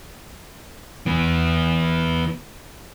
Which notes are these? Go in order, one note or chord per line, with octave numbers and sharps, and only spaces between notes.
E3 B3